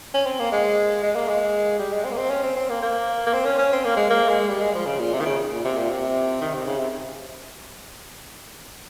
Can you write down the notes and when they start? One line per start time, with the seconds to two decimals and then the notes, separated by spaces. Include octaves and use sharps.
0.14 C#4
0.26 C4
0.39 A#3
0.52 G#3
1.03 G#3
1.15 A#3
1.29 G#3
1.79 G3
1.92 G#3
2.04 C4
2.11 A#3
2.17 C4
2.30 C#4
2.43 C4
2.56 C4
2.70 A#3
2.82 A#3
3.26 A#3
3.33 C4
3.46 C#4
3.58 C#4
3.72 C4
3.84 A#3
3.97 G#3
4.10 A#3
4.29 G#3
4.48 G3
4.61 G#3
4.74 F3
4.86 C#3
4.99 A#2
5.13 C3
5.20 D#3
5.25 C#3
5.51 A#2
5.64 C3
5.76 A#2
5.89 C3
6.41 D#3
6.53 C3
6.67 C#3
6.79 C3